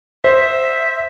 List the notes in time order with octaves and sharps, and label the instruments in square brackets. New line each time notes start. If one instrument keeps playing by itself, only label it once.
[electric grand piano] C5 [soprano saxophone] E5